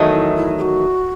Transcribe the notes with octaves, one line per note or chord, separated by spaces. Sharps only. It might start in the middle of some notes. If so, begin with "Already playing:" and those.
Already playing: E2 D#3 F#3 A3 D#4
E4
E4
G#4
F#4